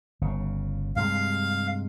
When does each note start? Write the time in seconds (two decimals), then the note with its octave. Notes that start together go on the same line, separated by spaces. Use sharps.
0.21 G1 C#3
0.96 G2 C3 G#3 F5